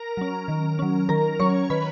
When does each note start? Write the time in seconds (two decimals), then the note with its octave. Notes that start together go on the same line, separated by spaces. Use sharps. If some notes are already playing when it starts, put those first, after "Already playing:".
Already playing: A#4 A#5
0.17 F#3 C#4
0.48 D#3
0.79 F#3 C#4
1.09 D#3 A#4 A#5
1.39 F#3 C#4 C#5 C#6
1.70 D#3 B4 B5